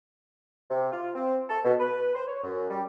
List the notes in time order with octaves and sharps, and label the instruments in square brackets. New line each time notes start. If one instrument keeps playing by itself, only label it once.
[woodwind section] C3
F4
C4
A4
B2
B4
C5
C#5
F#2
G3